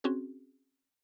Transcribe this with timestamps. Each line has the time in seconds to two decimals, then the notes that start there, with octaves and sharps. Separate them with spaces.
0.04 C4 C#4 F#4 G#4